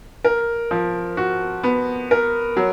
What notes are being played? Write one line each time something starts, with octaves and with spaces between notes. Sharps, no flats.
A#4
F3
F#4
B3
A#4
F#3